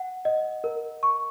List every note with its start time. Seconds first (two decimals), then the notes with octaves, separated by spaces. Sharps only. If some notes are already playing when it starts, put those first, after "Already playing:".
Already playing: F#5
0.25 D#5
0.64 A#4
1.03 C#6